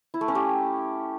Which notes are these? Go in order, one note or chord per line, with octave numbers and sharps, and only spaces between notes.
E4
A3
C#4
G4